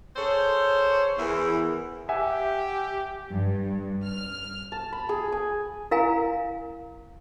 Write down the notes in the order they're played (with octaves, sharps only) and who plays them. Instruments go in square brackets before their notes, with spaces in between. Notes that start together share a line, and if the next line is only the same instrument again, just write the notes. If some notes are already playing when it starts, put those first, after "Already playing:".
[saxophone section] G#4 A4 C5 C#5
E2 E3 E4 G#4 A#4
[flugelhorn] G4 [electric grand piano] E5 F#5 G#5
[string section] G2
F6
[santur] A5
B5
G#4
G#5
[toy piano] E4 A#4 F5 G#5 A#5